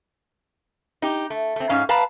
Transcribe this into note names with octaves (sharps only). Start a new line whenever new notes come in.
D#4 G4
A3
A3 C4
G#2 C#4 F5
B4 F5 A5 A#5